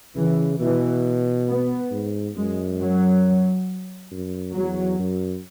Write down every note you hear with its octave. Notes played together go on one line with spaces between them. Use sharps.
C#3 E3
B2 E3
B3
G#2
F#2 G#3
F#3
F#2
E2 F#3
F#2